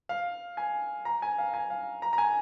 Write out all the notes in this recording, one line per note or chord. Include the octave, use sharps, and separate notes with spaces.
F5
G#5
A#5
G#5
F5
G#5
F5
A#5
A#5
G#5